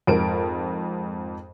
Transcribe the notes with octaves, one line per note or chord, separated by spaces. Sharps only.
F2 G#2 A#4 D7